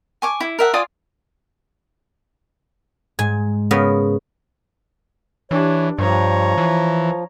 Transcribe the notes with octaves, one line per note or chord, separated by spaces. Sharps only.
G#5 C#6 D6
E4
A#4 E5 F#5
F4 D5 G#5 D#6
G#2 G#5
C#3 B3 A#4
E3 D4 G4 C#5
G2 F3 C#5 A#5
E3